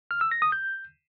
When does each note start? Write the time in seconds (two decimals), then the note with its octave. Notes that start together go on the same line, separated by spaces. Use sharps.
0.11 F6
0.21 E6
0.31 A#6
0.42 D#6
0.52 G6